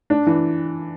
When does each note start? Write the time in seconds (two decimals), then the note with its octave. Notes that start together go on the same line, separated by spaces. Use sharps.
0.10 D4
0.27 E3